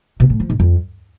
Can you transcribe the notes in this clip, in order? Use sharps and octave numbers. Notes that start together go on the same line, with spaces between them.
B2
A2
F3
G#2
F2